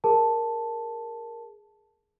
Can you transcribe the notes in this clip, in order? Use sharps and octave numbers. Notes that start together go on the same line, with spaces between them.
G#4 A#4 A5